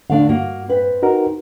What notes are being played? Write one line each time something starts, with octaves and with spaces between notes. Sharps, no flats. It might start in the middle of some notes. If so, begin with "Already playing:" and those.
D#2 D3 A3 D4 F5
G2 A#3 F#4
C4 B4
D#4 F#4 A#4